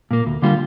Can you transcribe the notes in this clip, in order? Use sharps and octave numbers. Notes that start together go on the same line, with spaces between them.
A#2 A#3
D2
D3 G3 A#3 F4